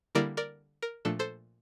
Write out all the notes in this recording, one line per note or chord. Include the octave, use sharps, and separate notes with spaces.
D3 G3 A#3 E4 A#4 D5
A#4 D5
A#4
A#2 F3 A3 D4 A4
A4 C5